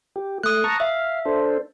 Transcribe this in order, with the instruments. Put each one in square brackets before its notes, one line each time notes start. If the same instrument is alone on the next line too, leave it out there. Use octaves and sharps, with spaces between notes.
[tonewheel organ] G4
[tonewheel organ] A3 [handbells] D#6 F#6
[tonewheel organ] A5 A#5 C#6
[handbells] E5 [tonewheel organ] F5
[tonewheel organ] D4 A4 C5